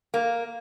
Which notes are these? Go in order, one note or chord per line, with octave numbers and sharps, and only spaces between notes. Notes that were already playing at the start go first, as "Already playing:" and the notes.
A#3